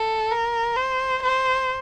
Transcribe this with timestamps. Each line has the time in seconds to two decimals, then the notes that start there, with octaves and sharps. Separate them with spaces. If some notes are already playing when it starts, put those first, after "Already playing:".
Already playing: A4
0.31 A#4
0.76 C5
1.23 C5